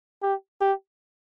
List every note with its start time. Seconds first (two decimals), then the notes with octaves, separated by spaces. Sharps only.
0.23 G4
0.61 G4